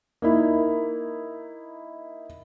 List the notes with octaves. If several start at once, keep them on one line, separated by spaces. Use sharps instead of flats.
A#3 D#4 E4